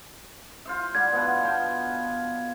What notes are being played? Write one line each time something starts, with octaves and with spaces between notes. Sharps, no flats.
F4 C5 E5
D3 G3 G#6
B2 F3 B3
F4 G5 A5